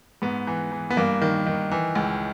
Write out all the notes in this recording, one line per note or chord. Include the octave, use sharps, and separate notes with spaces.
G#2 B3
E3
E3
B3
G2 A#3
D#3
D#3
E3
C#2